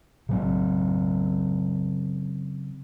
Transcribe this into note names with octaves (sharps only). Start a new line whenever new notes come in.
C#3 F#3 C4